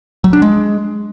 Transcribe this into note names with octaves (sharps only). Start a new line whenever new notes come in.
F#3
D4
G#3